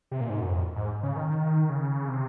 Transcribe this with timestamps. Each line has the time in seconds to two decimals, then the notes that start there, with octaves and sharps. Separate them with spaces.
0.11 C3
0.21 A#2
0.30 G#2
0.41 F#2
0.50 F2
0.76 G#2
1.03 C#3
1.16 D#3
1.29 D#3
1.70 C#3
2.09 C3